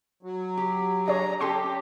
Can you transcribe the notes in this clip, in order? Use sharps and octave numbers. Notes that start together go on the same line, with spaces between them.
F#3
G4
D4 G#4 C#5 A#5
C#4 G4 A4 C6